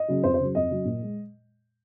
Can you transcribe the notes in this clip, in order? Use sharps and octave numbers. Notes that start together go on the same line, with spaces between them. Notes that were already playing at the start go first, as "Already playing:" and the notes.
Already playing: D#5
C#3 F#3
F2 C5
C5
C#3 F#3
F2 D#5
C#3 F#3
A#2
G#3